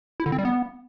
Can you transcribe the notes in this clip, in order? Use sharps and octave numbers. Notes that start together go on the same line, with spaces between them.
E4
D3
C4
G3
B3